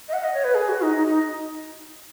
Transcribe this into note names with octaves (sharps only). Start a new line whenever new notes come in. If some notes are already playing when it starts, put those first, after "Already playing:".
D#5
F#5
D#5
C#5
B4
G#4
F#4
D#4
D#4
D#4